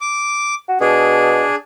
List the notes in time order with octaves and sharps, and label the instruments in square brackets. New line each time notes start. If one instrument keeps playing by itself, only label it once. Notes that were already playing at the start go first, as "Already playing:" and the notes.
[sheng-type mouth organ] D6
[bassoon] F#4
[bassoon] B2 [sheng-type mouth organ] D4 G#4